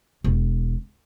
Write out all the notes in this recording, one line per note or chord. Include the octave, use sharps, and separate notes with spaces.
E1